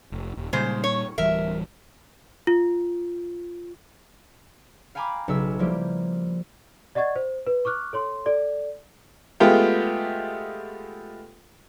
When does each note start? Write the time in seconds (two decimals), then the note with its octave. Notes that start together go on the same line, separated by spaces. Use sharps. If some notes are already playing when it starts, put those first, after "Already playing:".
0.12 F1
0.37 D#1
0.53 A#2 C#3 G3 G#3 C5
0.84 C#5
1.18 D1 E3 G3 A#4 E5
2.47 F4
4.95 F5 G5 G#5 A#5 B5 D6
5.28 B1 C#3 E5 E6
5.59 F3 G3 A#3 E4 G4
6.95 D5 D#5 F#5 C#6 G#6 A6
7.16 C5
7.47 B4
7.65 C#6 D6 F6 F#6
7.93 A4 C#5 C6
8.26 A4 D5
9.40 G#3 A3 B3 F4 G4